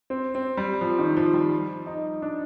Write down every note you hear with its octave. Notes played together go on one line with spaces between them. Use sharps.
C4
C4
G3
F3
D#3
F3
G3
D#4
D4